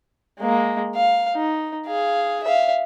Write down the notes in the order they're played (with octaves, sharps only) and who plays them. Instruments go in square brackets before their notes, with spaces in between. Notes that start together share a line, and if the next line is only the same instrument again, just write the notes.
[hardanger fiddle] G#3 A#3
F5
D#4
G#4 F5
E5 F5